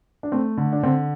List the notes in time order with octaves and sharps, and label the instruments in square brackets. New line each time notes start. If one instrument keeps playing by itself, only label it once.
[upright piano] D4
[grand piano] A3 [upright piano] C4
[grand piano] D3
[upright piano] D4
[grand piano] D3 [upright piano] C4